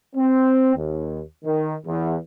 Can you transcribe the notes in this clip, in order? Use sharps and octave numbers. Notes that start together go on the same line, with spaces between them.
C4
D#2
D#3
E2